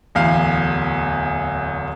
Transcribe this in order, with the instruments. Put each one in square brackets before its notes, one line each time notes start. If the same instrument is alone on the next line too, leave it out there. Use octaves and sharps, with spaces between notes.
[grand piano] D1 E2 F5